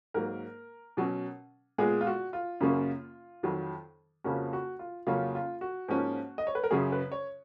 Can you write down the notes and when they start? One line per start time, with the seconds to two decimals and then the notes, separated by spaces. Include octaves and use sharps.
0.14 G#2 F#3 A#3 A#4
0.97 B2 F#3 C#4
1.78 A#2 G#3 B3 G#4
2.01 F4
2.07 F#4
2.33 F4
2.60 F#2 C#3 F#3 A#3 C#4
3.43 F2 D#3 F#3
4.24 F2 C#3 F3 A#3 C#4 F#4
4.53 F#4
4.79 F4
5.07 F2 C#3 F#3 A#3 C#4 F4
5.35 F4
5.61 F#4
5.89 G#2 F3 A#3 C#4
6.38 D#5
6.47 C#5
6.55 B4
6.64 A#4
6.71 F#2 C#3 F#3 C#4 G#4
6.92 B4
7.12 C#5